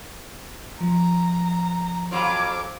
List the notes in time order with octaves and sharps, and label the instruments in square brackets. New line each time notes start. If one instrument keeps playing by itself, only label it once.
[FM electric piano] F3 [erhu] A#5
[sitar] F2 F#3 F4 [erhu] D6